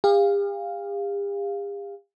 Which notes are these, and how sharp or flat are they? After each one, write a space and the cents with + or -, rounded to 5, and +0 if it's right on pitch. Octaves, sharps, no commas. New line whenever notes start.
G4 +45 F5 +0